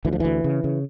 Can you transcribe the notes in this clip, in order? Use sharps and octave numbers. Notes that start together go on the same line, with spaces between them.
D2 E3
F3
D2 E3
C#3
C#3